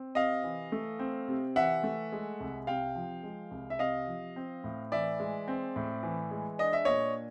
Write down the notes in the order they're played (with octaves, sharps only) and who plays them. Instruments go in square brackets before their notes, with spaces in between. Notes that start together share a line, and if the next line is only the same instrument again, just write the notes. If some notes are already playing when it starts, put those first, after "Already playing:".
Already playing: [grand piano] C4
C3 D#5 F5
E3
A3
C4
C3
E3 E5 F#5
A3
G#3
C2
C3 F5 G5
F3
G#3
C2
E5
C3 D#5 F5
F3
C4
A2
E3 D5 E5
G#3
C4
A2
E3
G#3
D4 D#5
E5
A#2 C#5 D#5